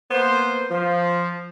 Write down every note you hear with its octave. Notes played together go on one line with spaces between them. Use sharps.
A#3 B3 C5
F3